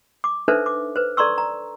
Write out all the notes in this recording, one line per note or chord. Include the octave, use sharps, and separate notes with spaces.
D6
D4 D#4 A4 B4 C5 E5
D6
B4 C5
A4 D5 A#5 C6 C#6 E6
A#5